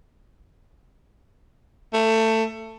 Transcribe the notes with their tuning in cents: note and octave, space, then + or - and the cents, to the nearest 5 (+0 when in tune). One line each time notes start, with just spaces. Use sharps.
A3 +20